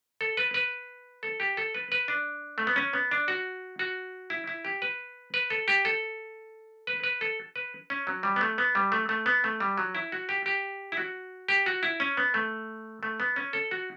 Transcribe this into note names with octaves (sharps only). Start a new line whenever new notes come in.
A4
B4
B4
A4
G4
A4
B4
B4
D4
A3
B3
C#4
B3
D4
F#4
F#4
E4
E4
G4
B4
B4
A4
G4
A4
B4
B4
A4
B4
C#4
F#3
G3
B3
A3
B3
G3
A3
A3
B3
A3
G3
F#3
E4
F#4
G4
G4
E4
F#4
G4
F#4
E4
C#4
B3
A3
A3
B3
C#4
A4
F#4